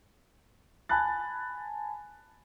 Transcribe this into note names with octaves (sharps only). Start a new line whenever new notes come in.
G#5 A5 B5 F#6 A6